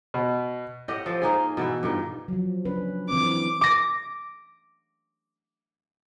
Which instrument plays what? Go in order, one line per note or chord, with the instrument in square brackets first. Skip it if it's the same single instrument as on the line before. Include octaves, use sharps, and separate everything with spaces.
[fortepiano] B2
[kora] A2 G4 D#5 F#5
F3 A4
A#3 D#4 G#4
B2 E3 E4
G2 A#2 D#3
[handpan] F3 F#3
C#4 D4 B4
[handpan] E3 C4 D4 [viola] D6
[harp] D6 A#6